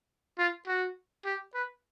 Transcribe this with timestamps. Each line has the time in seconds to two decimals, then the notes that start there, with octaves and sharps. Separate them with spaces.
0.39 F4
0.67 F#4
1.25 G4
1.54 B4